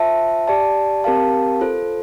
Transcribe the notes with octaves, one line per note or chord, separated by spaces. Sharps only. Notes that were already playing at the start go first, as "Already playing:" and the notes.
Already playing: F4 C5 E5 A5
G4 D5 A5
C4 G4 A#4 F5 A5
F4 A4 C5